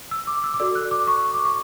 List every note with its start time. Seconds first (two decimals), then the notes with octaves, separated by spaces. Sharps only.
0.11 E6
0.27 D6
0.44 E6
0.54 D6
0.60 F#4 A4 D5 E6
0.75 F#6
0.91 D6
1.07 C#6
1.34 D6
1.45 C#6